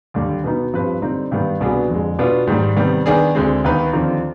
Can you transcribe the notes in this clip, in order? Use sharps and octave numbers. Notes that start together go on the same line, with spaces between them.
D#2 D3 G3 D4
B2 B3 D#4
G2 F3 C4 G4 B4
D3 G3 C4 D#4
G2 D#3 G3 B3
C2 B2 B3 D4 G#4
F2 D3 G#3
B2 B3 D4 F4
G#2 D#3 G3
C3 D#3 G3 B3
D#3 B3 D4 G#4
D2 D3 G#3 C4
D#2 D#3 B3 D#4 B4
D#2 D3 F3 C4 D#4